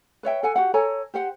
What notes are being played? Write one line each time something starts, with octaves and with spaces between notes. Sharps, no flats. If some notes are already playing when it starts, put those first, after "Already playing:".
B4 C#5 E5 G5
A4 F#5 G#5
F#4 G4 F#5
A4 C#5 G#5 A#5
G4 C5 F#5